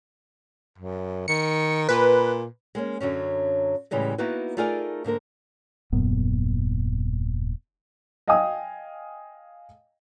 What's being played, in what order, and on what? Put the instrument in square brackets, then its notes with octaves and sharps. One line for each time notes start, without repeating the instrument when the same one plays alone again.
[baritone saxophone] F#2
[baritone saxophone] D#3 [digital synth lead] C#7
[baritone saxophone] A#2 [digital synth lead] B4
[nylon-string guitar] G#3 A#3 C#4
F#2 D3 F#3 C#4
A2 C#3 E3 G3 G#3
A#3 B3 D#4 E4 F#4 B4
A3 D#4 F4 G#4 A#4 D5
G#2 D3 A#3 A#4
[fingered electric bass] D#1 F#2 A#2 B3
[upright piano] D#5 F5 G5 G#5 D#6